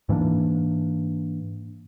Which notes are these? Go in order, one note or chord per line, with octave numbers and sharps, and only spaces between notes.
G#2 E3 A#3 D4